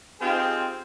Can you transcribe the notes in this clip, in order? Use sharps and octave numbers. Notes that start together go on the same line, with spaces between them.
C4 D#4 F4 G4 G#4